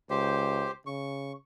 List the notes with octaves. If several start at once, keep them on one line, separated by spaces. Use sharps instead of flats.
C#2 G4 C5
C#3 C#6